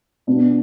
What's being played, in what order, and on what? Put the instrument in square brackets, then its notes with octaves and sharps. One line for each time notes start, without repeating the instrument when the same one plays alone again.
[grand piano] B2 B3 D4